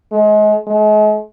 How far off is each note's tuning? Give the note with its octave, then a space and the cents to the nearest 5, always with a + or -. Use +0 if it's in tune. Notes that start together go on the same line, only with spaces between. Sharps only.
G#3 +30
G#3 +40